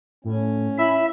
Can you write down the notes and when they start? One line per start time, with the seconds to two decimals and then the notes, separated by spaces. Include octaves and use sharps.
0.25 A2 C#4
0.78 E4 E5 B5